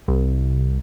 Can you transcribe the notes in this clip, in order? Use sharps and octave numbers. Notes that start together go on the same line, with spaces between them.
C2